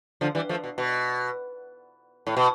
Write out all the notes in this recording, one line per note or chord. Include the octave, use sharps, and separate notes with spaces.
D3 F3
E3 G3
F3 A3
B2
B2
A2
B2